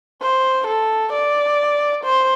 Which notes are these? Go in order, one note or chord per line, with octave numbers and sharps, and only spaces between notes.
C5
A4
D5
C5